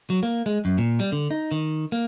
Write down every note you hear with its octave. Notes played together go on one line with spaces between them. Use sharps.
F#3
A#3
G#3
F#2
A#2
G3
D3
D#4
D#3
A#3